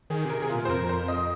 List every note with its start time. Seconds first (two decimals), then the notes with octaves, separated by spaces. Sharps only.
0.10 D#3 G#4
0.25 C3 A#4
0.40 C3 G#4
0.49 A#2 F4
0.65 C5
0.69 F2 A#4
0.89 C5
1.08 D#5